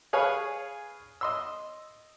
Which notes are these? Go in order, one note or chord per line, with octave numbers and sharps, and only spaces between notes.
G#4 B4 C#5 F5 G#5
D#5 C6 E6